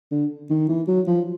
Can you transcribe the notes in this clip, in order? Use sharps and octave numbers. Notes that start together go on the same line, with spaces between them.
D3
D#3
E3
F#3
F3